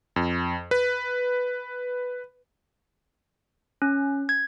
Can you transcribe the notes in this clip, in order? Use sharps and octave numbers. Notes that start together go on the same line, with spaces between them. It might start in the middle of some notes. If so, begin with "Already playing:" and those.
F2
B4
C#4
G#6